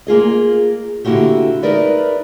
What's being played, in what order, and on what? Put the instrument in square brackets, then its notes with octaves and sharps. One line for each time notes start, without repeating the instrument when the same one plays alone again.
[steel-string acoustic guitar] A#3 F4 G#4 D#5
D3 A#3 E4 F#4 G4
D#4 A#4 B4 D5 E5